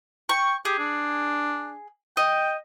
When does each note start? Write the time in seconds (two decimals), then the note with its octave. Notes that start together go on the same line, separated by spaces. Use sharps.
0.29 G5 C#6
0.65 G4 G#4
0.79 D4
2.17 D#5 G5